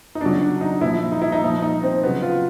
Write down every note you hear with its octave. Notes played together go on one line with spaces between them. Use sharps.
D#4
E2 C#3 F#3 D4
D4
D#4
A#2 F3 E4
D#4
E4
D#4
A#2 F3
D#4
C4
E2 C#3 F#3 B3
F4